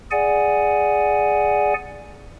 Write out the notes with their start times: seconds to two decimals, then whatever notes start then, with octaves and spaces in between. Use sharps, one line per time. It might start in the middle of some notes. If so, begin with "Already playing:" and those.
0.11 G#4 D5 F#5 G#5